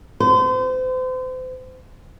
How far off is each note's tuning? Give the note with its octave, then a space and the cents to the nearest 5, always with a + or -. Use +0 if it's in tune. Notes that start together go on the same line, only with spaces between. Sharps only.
C5 -35